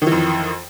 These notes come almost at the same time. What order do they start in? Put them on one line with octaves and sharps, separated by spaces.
D#3 E3 F2